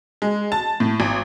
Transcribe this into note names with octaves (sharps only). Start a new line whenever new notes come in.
G#3
A5
A2
G#1